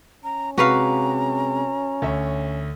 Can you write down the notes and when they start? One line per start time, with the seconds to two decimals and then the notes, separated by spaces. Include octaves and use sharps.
0.24 C#4 A#5
0.58 C3 G#3 F#4 B4 F5 A#5
2.02 D2 C#5 E5